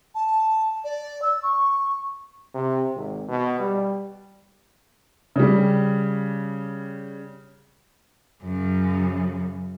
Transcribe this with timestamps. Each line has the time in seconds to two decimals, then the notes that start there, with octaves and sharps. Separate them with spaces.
0.15 A5
0.84 D5
1.22 E6
1.43 C#6
2.54 C3
2.95 G#1
3.28 B2
3.60 G3
5.36 C#3 G3
8.43 F#2 C#3